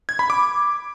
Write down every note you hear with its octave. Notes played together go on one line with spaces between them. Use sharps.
G#6
B5
D6